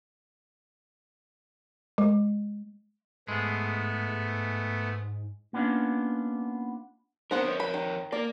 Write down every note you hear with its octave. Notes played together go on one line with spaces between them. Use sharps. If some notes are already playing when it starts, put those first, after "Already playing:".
G#3
G#2 G#3 A3 B3
A#3 B3 C#4 D4 F4
B3 C4 D4 A#4 C5 F#5
F2 A#4 C#5
B5
D#3
A#3 D5